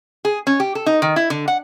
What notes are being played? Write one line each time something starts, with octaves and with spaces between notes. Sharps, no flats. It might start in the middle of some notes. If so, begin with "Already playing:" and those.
G#4
C#4
G4
A4
D#4
D#3
E4
D3
F#5